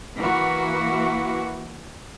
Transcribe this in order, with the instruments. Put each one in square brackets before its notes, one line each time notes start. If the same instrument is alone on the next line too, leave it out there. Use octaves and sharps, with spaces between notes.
[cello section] E3 A#3 F#4